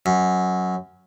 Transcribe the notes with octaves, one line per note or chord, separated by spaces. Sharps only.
F#2